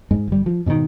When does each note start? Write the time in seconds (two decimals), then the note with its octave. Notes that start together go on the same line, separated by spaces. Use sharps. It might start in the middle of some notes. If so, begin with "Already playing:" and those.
0.11 G#2 G#3
0.28 G1 G3
0.46 F3
0.66 G#2 B2 D3 D#3